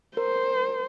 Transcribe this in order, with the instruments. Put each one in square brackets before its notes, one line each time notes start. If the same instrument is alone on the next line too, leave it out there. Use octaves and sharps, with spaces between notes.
[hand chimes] A#4 [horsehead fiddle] C5